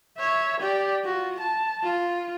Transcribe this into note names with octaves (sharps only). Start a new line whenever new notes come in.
C#5 E5
G4 D5
F4 F#4
A5
F4